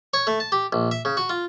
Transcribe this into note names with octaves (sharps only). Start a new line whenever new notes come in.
C#5
A3
A5
G4
A#1
E5
C#3
F#4
F4